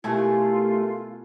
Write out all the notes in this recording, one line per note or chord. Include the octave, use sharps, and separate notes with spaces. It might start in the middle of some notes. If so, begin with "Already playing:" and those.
B2 A3 E4 F4 G4 A#4 G#5